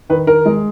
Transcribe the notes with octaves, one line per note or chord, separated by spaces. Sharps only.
D#3 B4
D#3 A#4
G#3